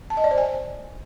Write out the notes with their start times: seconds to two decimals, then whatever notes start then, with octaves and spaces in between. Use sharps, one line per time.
0.10 A5
0.17 D#5
0.24 D5
0.31 C5
0.38 G#5